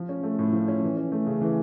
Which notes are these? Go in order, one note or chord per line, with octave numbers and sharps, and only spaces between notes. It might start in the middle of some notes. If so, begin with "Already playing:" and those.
Already playing: F3
C#4
A3
A2
F3
C#4
E3
C#4
A3
C#3
E3